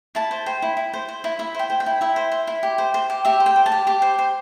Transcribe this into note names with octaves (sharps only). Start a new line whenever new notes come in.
E4 A5
C5
C5 G5
E4
E4
C5
C5
E4
E4 E5
C5 G5
C5
G5
E4
E4 E5
C5
C5
E4
G4
C5
C5
G4
G4 E5
C5
G5
C5
A5
G4
G4 D6
C5
C5